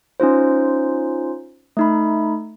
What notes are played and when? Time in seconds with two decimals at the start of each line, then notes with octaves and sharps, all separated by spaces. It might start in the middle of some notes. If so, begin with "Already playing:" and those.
0.20 C#4 D#4 F4 C5
1.77 A3 D#4 B5